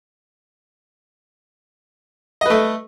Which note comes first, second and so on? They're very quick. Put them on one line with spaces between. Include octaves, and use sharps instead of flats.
D#5 B4 A3